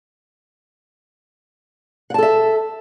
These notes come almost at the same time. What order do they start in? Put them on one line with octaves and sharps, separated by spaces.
F#5 A5 A4 E5